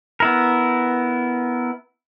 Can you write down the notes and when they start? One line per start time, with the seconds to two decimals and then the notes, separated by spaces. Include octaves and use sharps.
0.20 B3 E4 A#4